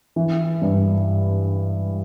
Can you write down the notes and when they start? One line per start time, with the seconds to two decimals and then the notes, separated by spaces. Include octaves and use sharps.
0.16 E3
0.62 G2